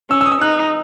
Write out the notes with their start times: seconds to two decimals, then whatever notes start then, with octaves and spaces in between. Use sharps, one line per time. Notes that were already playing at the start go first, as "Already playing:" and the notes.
0.10 C#4 E6
0.21 E6
0.26 D#6
0.32 E6
0.41 D#4 F#6